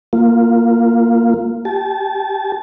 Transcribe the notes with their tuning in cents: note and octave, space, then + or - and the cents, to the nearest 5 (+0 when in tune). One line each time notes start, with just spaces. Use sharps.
A#3 +0 F4 +0
G4 +0 A5 -25